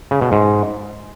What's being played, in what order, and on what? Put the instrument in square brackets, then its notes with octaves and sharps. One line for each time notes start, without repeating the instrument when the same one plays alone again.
[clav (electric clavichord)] C#3
B2
G#2